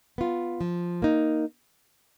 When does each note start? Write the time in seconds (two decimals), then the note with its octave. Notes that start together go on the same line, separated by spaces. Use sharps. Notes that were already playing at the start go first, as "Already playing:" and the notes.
0.18 B3 F4
0.61 F3
1.02 A#3 D#4